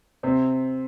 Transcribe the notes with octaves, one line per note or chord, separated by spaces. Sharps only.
C3 C4